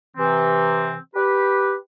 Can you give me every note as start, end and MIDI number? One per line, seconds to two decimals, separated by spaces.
0.17 0.95 48
0.17 0.95 52
0.17 0.95 60
1.15 1.74 67
1.15 1.74 71